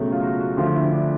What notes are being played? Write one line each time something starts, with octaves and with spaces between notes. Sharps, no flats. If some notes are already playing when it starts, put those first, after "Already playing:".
Already playing: C#2 B2 F#3 A3
F4
F#4
F#4
D2 D3 F3 A3 F4
E4
D4